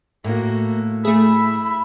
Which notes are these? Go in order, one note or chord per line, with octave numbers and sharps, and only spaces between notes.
A2 A#3 F#4
A3 G#4 E5 B5